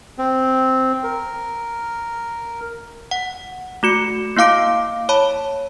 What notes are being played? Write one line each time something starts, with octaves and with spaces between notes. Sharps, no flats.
C4
A#4
F#5
A3 F#4 C#7
A#3 E4 F5 D6 D7
C#5 A5 B5